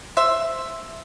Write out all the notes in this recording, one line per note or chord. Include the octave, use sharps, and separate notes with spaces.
C5 E5